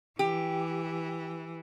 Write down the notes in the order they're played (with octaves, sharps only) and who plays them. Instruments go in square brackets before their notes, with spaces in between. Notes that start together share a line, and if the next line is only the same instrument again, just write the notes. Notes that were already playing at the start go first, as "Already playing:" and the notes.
[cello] E3 [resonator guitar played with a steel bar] G4